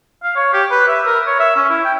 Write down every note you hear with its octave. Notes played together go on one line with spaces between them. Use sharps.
F5
C#5
G4
B4
E5
A#4
C#5
E5
C#4
E4
G5